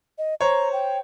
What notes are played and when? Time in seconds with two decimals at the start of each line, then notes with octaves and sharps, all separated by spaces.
0.18 D#5
0.41 C5 C#5 A#5
0.73 G5